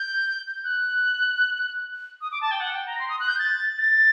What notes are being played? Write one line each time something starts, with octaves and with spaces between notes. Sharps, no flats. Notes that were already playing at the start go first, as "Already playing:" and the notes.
Already playing: G6
F#6
D#6
D6
A5
G5
F#5
G5
A#5
C6
D#6
F#6
G6
A6
A6